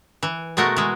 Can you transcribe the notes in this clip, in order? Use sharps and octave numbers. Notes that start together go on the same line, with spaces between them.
E3
B2 G#3 A3 F#4 A#4
E3 G#3